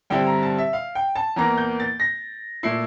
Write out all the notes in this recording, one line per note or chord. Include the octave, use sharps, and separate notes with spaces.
G2 D3 G3 C4 E4 G5
A#5
A5
E5
F5
G5
A5
E2 E3 A#3 A#5
G6
A6
A#6
A#2 A3 E4 C7